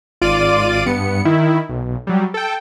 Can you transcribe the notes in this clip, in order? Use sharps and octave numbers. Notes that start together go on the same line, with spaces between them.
G#1 F4 D5 D6 D#7
G2 B3 C#7
D#3 E4
B1
F#3 G3
A4 G5